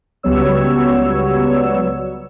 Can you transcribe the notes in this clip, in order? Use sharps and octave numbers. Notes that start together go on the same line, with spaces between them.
C#2 F#3 G3 B3 C#5 E6